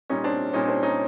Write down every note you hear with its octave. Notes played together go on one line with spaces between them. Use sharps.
A#2 G3 C#4 D#4
C4 D4
A#2 G3 C#4 D#4
C4 D4
C#4 D#4